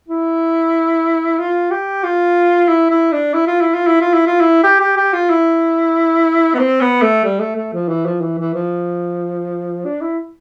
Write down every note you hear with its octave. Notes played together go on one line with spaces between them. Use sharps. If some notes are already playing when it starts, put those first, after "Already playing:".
E4
F4
G4
F4
E4
E4
D4
E4
F4
E4
F4
E4
F4
E4
F4
E4
G4
G4
G4
F4
E4
B3
C4
B3
A3
G3
A3
A3
F3
E3
F3
E3
E3
F3
D4
E4